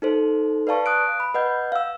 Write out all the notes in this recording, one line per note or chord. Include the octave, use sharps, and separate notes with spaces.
D#4 A4 C5
B4 D5 F5 A5 C#6
D#6 F#6 D7
B5
B4 D#5 F#5 G6
F5 E6